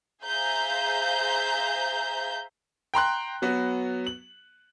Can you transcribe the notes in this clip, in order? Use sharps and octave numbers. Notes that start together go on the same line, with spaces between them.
G#4 C5 E5 F5 A#5 G6
G5 A#5 C6 F#6
F#3 B3 F#4
F#7